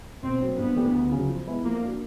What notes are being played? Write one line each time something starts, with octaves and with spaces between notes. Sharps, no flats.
B2 C4
F#3 A#3
G2 B3
E3 A3 D4 G4
D2
C#3 F#3
F3
G#3 B3 E4
F3 A#3
A#3 D4 F#4